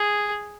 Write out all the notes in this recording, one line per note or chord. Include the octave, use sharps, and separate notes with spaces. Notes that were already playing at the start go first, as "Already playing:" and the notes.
Already playing: G#4